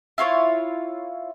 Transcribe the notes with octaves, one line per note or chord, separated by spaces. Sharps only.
E4 F4 C5 C#5